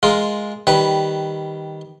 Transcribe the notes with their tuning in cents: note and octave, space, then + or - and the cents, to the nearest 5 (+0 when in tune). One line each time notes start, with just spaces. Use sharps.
G#3 +0 F4 +0 A#4 +0
D#3 +0 G3 -5 B4 +0